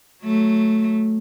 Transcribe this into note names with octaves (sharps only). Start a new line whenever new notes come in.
F#3 A3